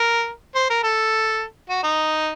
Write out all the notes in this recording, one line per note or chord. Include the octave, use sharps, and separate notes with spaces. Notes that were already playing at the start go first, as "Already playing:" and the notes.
Already playing: A#4
C5
A#4
A4
F#4
D#4